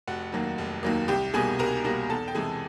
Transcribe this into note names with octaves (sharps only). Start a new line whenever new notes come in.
F1 F#4 F#5
D#2 D#3 F#3 A#3
F1
D#2 D#3 F#3 A#3
C2 G4 G5
B2 G3 A#3 G#4 G#5
C2 A#4 A#5
B2 G3 A#3
E2 A4 A5
G5
C3 E3 G#3 G#4 G#5